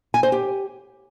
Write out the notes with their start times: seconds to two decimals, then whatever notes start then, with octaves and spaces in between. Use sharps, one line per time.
0.14 G#5
0.23 C5
0.32 G4